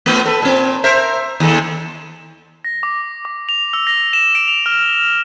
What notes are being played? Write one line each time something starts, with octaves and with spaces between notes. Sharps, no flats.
A3 B3 F4
A4 B4
A#2 C4
A#4 C5 E5
D#2 A4
A#6
D6
D6
F7
E6
A#6
E7
D7
F7
F6